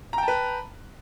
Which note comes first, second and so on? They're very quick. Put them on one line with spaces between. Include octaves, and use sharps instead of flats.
A#5 G5 A5 B4